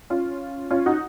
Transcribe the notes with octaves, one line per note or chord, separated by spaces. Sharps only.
C#4 F4
C#4 F4
D#4 F#4